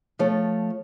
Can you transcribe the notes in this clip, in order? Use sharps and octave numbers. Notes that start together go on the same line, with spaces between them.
F3 A3 C#5